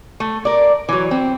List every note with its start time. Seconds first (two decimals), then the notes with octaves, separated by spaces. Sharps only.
0.20 A3
0.45 A#4 D5
0.89 E3 F#3
1.11 C4